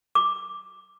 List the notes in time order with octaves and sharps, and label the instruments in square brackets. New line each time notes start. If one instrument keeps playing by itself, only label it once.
[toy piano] D6